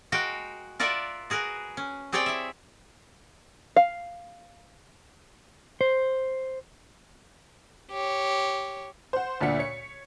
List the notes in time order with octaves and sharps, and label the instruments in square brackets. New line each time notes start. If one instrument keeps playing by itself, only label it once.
[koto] G#3 F#4 A#4 F5 G5
F4 A#4 D5 E5 F#5
F#4 G#4 A#4 B4
C#4
C4 G4 G#4 C#5 D5 G5
E4 E5
[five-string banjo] F5
[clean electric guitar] C5
[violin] G4 C#5
[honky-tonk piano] C5 F#5
D2 A#2 D4 F#5 B6 C#7
C#5 C#7